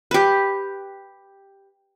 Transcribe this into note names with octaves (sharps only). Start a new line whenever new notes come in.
G4 B4